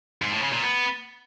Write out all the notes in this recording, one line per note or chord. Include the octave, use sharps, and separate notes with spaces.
G#2
A2
C#3
A#2
B3